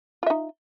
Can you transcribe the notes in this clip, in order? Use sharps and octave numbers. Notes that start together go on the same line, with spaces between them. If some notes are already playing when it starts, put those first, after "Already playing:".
D#4 F4 E5